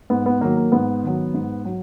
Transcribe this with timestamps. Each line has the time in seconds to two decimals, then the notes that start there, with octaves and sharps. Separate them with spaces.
0.10 G#2 B3
0.26 B3
0.41 D#3 F#3 A#3
0.57 A#3
0.72 G#2 B3
1.03 D#3 F#3
1.34 G#2
1.65 F#3